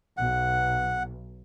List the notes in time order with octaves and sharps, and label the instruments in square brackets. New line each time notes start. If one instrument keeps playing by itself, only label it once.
[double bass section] B1 [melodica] F#5